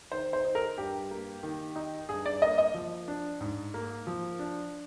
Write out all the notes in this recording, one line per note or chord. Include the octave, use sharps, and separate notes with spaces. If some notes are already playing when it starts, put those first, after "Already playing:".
D#3 C5
C5
D#4
A#4
G2 G4
A#3
D#3
D#4
G2 G#4
D5
A#3 D#5
D#5
F3
D4
G#2
A#3
F3
D4